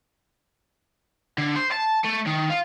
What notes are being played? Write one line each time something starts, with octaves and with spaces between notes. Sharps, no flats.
D3
C5
A5
A3
D#3
F4